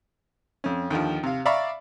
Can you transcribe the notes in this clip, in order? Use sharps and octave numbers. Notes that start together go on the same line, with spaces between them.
F2 C#4
D#2 D3 F3
C3 F5
D5 E5 F5 A#5 B5 C#6